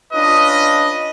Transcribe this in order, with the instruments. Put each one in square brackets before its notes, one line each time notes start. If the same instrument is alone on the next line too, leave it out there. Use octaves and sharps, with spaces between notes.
[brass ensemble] C#4 D4 F4 B4 D#5